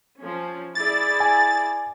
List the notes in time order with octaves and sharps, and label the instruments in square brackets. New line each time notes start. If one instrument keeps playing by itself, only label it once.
[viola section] F3 C#4
[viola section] E4 G#4 D5 [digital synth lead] A6
[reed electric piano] G#5